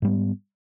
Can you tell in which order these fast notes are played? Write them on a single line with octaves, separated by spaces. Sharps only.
G#2 G3 B3